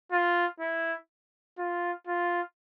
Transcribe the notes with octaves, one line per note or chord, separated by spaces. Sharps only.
F4
E4
F4
F4